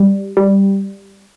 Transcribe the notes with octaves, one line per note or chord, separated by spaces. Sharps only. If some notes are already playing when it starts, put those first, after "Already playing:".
Already playing: G3
G3